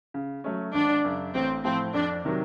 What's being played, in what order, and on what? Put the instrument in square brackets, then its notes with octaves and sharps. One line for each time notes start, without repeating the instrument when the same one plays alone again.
[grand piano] C#3
F#3 A3 C#4
[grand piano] G#1 [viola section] D4
[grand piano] F#2 C#3
[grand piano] A1 [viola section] C4
[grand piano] A2 F3 [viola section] C4
[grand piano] F2 [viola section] D4
[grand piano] C3 D#3 F#3